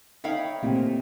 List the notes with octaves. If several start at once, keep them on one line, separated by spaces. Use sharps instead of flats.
D#4 C#5 E5 F5 G5 B5
A#2 A3 C4 E4 G4